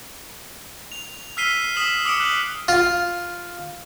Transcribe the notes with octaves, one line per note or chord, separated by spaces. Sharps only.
F7
E6 F6 B6 C7 D#7 G7
D#6 B6 E7 F#7 G7
D6 D#6 C#7 D7 E7
F#6 F#7
F4